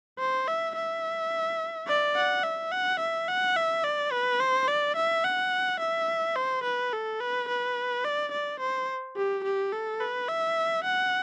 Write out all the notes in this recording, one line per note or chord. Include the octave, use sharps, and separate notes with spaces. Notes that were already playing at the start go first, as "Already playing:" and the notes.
C5
E5
E5
D5
F#5
E5
F#5
E5
F#5
E5
D5
B4
C5
D5
E5
F#5
E5
C5
B4
A4
B4
B4
D5
D5
C5
G4
G4
A4
B4
E5
F#5